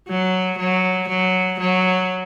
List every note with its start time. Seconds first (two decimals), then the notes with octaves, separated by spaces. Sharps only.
0.09 F#3
0.59 F#3
1.08 F#3
1.60 F#3